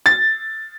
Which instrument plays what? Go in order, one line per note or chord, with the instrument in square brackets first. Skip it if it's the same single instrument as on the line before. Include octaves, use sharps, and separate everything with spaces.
[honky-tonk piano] A6